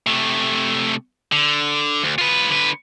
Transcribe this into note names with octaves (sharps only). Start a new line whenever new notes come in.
C3 A3
D3
D2
F4 B4
D3 B4